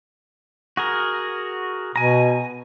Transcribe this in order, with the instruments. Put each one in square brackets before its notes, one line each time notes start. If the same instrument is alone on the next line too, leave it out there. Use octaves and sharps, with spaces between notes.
[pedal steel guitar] F#4 G#4 A#4
[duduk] B2 [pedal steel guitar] G#5 A#5